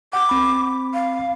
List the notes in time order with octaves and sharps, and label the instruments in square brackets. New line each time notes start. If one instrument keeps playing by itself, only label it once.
[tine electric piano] F#5 [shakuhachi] D6
[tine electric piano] C4 B5
[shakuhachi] F5